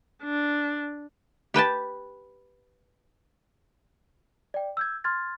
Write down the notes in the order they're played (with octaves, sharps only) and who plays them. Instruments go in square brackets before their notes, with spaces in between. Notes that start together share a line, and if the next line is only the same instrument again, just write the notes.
[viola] D4
[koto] G4 B4 G5 A5
[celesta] D5 G5
E6 G6 G#6
C6 F6 G#6 A6